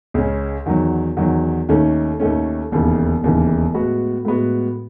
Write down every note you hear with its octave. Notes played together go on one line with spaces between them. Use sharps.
C#2 C#3 G#3 C#4
E2 D#3 F#3
E2 D#3 F#3
D#2 D#3 A3 C#4
D#2 D#3 A3 C#4
E1 D#2 C#3 E3
E1 D#2 C#3 E3
A2 G#3 B3 F#4
A2 G#3 B3 F#4